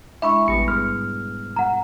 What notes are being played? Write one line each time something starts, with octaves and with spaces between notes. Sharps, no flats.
G#3 D4 E4 E5 B5 C#6
A1 B2 G3 B3 C#7
G#2 B2 F6
F#5 A#5